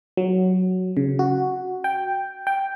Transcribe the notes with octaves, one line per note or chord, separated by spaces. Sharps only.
F#3
C#3
F#4
G5
G5